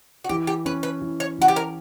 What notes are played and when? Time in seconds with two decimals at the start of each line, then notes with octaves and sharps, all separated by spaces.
0.24 F#4
0.29 E3 G4
0.47 G4
0.65 C#4 B4
0.83 B4
1.02 E3
1.20 C#5
1.39 E3 F#4
1.48 G4
1.56 A#4